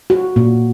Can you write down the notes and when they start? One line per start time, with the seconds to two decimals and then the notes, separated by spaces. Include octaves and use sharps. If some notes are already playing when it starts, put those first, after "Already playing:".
0.10 F#4
0.36 A#2